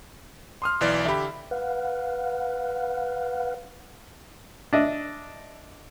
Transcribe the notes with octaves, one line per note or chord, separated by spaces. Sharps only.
C6 D#6 F6
B1 E3 D5
D3 G4 E5 B5
B4 F5 F#5
D4 D#5 E5